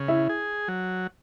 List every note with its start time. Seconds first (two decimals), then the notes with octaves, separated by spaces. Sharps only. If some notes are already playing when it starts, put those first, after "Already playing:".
Already playing: C#3
0.08 E4 E5
0.29 G#4
0.68 F#3